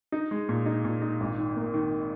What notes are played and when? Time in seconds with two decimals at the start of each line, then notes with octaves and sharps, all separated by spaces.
0.12 D#4
0.31 G#3
0.49 A#2
0.66 D#4
0.85 A#2
1.02 D#4
1.20 G#1
1.38 D#3
1.56 A#3
1.74 D#3